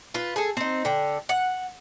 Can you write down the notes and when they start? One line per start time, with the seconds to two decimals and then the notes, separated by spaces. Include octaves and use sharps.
0.14 F4 B4
0.36 G#4 A4
0.57 C4 D#4
0.85 D3 G5
1.29 F#5